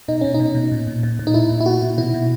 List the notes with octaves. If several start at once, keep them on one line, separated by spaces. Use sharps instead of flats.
B2 D#4
B2 C#4
D#4
B2
B2
A#2
A#2
A#2
A#2
D#4
A#2 E4
A#2
E4
A#2 F#4
A#2
B2 E4
B2